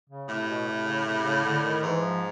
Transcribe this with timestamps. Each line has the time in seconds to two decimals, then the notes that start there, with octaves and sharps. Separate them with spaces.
0.09 C#3
0.28 A2 C3
0.48 B2
0.67 C3
0.87 C#3
1.05 C3
1.25 C#3
1.44 D3
1.63 D#3
1.83 G#2 E3
2.01 F3